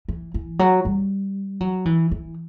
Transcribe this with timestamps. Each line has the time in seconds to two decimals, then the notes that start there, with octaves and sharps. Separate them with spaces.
0.08 E3
0.34 E3
0.59 F#3
0.85 G3
1.60 F#3
1.85 E3
2.11 E3